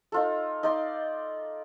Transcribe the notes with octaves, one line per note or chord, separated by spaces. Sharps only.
D#4 F4 A4
D#4 D5 C6